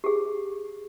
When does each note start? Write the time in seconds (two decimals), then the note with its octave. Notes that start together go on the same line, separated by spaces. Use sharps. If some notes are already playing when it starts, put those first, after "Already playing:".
0.04 G4 G#4